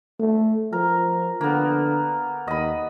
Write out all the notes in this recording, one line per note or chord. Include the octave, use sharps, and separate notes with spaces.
A3
F3 A#4
D3 A#3 B3
D#2 D#5 B5